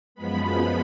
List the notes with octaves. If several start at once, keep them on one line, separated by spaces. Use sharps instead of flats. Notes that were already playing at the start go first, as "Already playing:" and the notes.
F#2 F3 G#3 B3 B5